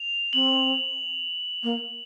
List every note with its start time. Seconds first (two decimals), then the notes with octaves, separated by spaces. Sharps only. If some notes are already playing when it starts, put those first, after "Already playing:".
Already playing: F7
0.33 C4 F#7
1.63 A#3